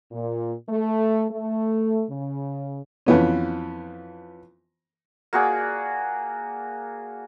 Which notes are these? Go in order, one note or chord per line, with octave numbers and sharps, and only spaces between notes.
A#2
A3
A3
C#3
F2 E3 B3 C#4
A#3 F#4 G#4 D5